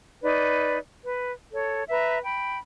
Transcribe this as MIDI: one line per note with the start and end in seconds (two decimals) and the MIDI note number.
0.23 0.77 63
0.23 0.77 71
0.23 0.77 74
1.03 1.33 71
1.52 1.83 69
1.52 1.83 73
1.88 2.18 71
1.88 2.18 76
1.88 2.18 82
2.23 2.58 79
2.23 2.58 83